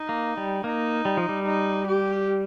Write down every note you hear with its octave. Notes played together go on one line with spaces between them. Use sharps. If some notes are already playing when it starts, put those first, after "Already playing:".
Already playing: D#4
A#3
G3
A#3 D#4
G3
F3
G3
D#4
G4